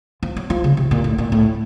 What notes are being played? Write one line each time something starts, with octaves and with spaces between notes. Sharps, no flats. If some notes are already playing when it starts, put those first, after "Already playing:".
F3
F#3
F3
C#3
C3
A#2
A2
A#2
A2